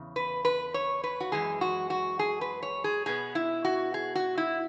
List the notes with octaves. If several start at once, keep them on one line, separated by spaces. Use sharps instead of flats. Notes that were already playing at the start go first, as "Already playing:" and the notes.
Already playing: E2 C#3
B4
B4
C#5
B4
F#4
F#2 E3 G#3 G#4
F#4
F#4
G#4
B4
C#5
G#4
B2 B3 G#4
E4
F#4
G#4
F#4
E4